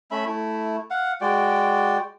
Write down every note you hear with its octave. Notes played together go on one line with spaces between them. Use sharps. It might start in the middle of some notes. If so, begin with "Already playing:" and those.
A3 C#4 E5 B5
A3 E4
F5 F#5
G#3 F#4 D5 G5